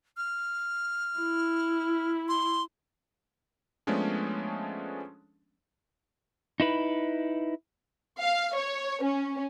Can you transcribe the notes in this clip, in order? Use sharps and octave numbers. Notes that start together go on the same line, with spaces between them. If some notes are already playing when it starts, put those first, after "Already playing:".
F6
E4
C6
F3 G#3 A3 B3 C#4 D4
D#4 E4 B4
F5
C#5
C#4